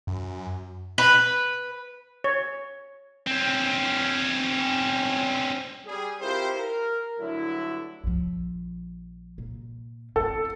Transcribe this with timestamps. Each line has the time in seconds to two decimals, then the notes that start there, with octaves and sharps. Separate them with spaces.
0.07 F#2
0.98 B4
2.24 C#5
3.27 C4 C#4
5.86 G3 G#4
6.20 C4 E4 F4 G4 A#4 C5
6.56 A#4
7.19 G2 D3 F#3 A3 E4
8.04 A#1 F3
9.38 A#2
10.16 C4 E4 A4